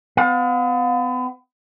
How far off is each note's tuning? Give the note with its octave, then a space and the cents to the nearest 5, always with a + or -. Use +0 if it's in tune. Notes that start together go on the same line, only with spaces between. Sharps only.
B3 +40 F5 +45